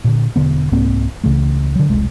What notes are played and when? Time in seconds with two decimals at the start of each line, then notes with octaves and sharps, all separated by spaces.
0.04 A#2 D3
0.36 E1 E2 D3 B3
0.72 C2 G#2 A#3 C4
1.24 C#2 C#3 E3 A3
1.75 D3 F#3
1.90 E1 C2 G#3